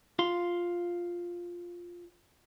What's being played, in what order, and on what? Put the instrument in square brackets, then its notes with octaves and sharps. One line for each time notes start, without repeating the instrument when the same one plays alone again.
[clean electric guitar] F4 F5 C6